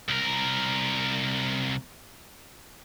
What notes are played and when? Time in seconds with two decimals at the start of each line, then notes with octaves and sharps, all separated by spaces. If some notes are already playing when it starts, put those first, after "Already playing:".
0.09 C2 A#4